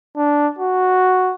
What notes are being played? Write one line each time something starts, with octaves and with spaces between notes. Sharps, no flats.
D4
F#4